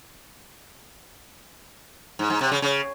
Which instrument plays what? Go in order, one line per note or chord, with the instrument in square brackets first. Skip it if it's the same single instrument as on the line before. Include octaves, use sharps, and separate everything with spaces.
[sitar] G#2
G#2
C3
C#3
C#3